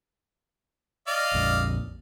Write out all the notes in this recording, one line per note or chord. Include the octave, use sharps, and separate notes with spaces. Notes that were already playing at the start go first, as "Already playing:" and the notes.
D5 D#5 F5
A#1 F2 A#2